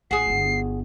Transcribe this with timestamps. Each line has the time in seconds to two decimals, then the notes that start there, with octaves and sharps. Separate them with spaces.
0.11 A#1 F#4 G#4 C7
0.27 G1 E4